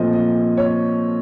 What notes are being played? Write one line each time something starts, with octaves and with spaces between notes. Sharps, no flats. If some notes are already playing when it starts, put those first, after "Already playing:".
Already playing: A#2 F3 A3 C4 D#5
D#5
C#5